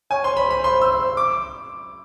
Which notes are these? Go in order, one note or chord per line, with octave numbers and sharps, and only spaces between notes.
C#5 G#5
C5 C6
C#5 B5
C5 B5
C6
E6
D6